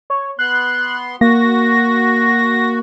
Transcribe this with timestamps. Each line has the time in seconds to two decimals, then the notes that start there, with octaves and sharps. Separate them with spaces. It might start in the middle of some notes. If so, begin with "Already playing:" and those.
0.10 C#5
0.39 B3 C6 F#6
1.21 A#3 F#4 A#6